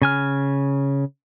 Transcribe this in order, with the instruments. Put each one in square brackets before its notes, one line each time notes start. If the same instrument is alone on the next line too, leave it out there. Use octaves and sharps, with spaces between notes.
[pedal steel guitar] C#3 G#5 F6